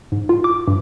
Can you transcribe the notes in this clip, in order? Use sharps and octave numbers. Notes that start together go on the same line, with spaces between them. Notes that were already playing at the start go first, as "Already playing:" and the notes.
G#2
F4
D6
G2